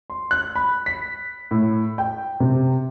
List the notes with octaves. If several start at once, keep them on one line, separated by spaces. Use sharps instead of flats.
C6
F#6
B5
B6
A2
G5
C3